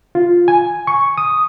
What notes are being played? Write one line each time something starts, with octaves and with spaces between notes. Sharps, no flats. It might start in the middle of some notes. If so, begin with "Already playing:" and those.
F4
G#5
C#6
D#6